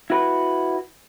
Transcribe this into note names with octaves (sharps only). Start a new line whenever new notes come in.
E4 F#4 B4